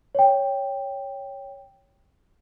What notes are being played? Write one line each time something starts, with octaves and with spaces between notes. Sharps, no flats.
C#5 G5